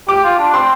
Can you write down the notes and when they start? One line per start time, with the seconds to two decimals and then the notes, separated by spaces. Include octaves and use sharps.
0.08 G4 D6
0.24 F4
0.39 D4
0.54 C4 C6